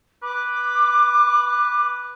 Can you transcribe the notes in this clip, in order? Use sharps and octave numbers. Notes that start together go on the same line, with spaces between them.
B4 D6